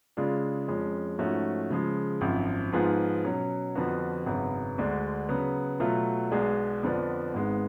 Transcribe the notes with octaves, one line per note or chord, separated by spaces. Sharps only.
C#3 G#3 D4 F4
F2 F3 G#3 C#4
G#2 F3 A3 C#4 F#4
C#3 F3 G#3
G#1 F#2 F3
G#2 F3 B3 F4 G#4
B2 F#3 C#4
F2 D3 F3 B3 F#4
G#1 F#2 C#3 F#3 B3
D2 D3 G#3 D4
C#3 F#3 B3
B2 F#3 A3 F4
B1 B2 G#3 D4 G#4
F2 D3 F3 B3 D4
G#1 G#2 G#3 B3